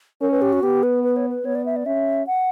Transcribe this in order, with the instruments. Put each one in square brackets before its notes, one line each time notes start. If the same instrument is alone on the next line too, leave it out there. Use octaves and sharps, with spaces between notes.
[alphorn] C#4 [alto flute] A#4
[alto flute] B4
G4
F#4
[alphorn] B3 [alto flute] G4
[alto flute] B4
B4
C#5
B4
[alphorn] B3 [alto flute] C#5
[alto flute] D5
E5
D5
[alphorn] C#4 [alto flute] E5
[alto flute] F#5